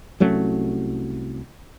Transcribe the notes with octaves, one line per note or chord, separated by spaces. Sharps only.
C2 F#3 A3 C#4